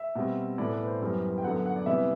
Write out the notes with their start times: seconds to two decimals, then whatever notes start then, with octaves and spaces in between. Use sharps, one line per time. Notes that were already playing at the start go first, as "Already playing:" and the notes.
Already playing: E5
0.15 B2 G3 C4
0.58 A2 E3 B3 D5
0.73 B4
0.87 C5
1.01 F#2 E3 G3 B3
1.38 G5
1.44 F#2 D3 F#3 B3 F#5
1.55 F#5
1.66 F#5
1.76 D5
1.86 C3 E3 G3 B3 E5